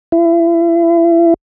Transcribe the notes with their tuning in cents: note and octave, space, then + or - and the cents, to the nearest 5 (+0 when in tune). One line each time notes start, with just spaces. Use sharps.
E4 +35